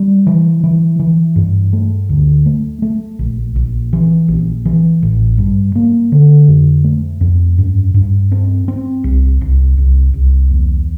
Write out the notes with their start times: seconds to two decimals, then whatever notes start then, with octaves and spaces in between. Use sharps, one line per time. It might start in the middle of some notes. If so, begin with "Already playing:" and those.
Already playing: G3
0.27 E3
0.64 E3
0.99 E3
1.36 G2
1.73 A3
2.09 D2
2.46 A3
2.82 A3
3.19 A#1
3.56 A#1
3.93 E3
4.28 A#1
4.65 E3
5.03 A1
5.38 G2
5.76 A#3
6.12 D3
6.48 F2
6.84 A3
7.21 F2
7.58 G2
7.94 G2
8.32 C4
8.68 C4
9.04 C2
9.41 C2
9.78 C2
10.13 C2
10.50 E2